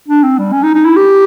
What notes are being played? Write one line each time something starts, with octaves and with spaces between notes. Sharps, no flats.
D4
C4
G3
C#4
D#4
D#4
E4
G4